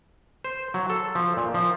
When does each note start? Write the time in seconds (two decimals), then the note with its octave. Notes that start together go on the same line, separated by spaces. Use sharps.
0.44 C5
0.74 F#3
0.90 A4
1.15 F3
1.37 A#2
1.54 F3